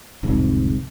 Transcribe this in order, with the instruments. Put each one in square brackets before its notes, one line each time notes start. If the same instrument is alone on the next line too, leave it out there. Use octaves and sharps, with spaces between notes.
[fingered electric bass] D1 C2 F2 G#2